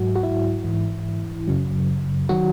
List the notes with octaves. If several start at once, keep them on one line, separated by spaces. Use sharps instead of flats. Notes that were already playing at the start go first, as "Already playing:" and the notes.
Already playing: G#2 F#3 F#4
F#4
E4
G#2 E3
F#2 C#3 F#3
D#3 F#3 F#4